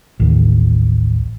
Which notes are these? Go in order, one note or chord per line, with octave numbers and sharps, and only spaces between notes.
A1 D#2